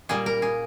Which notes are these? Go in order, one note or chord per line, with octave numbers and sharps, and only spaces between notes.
A#2 G3 A#3 G#4
A#4
G#4